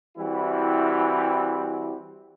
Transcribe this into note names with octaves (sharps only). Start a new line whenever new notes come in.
E3 G3 C4 E4 F#4